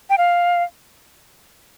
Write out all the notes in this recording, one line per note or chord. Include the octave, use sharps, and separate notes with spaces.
G5
F5